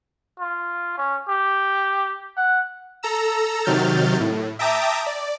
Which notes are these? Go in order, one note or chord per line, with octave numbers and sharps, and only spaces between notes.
F4
C#4
G4
F#5
A4 A#5 E6
C3 D#3 F#3 F6 G6 A6
A2
E5 G5 A5 A#5 D6 D#6
D5